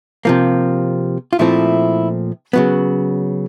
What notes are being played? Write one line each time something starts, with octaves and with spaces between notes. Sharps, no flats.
C3 F3 A#3
F4
A#2 F3 A3 C4 E4
C#3 F#3 B3